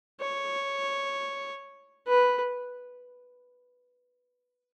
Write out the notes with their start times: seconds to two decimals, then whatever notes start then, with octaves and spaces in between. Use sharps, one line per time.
0.20 C#5
2.07 B4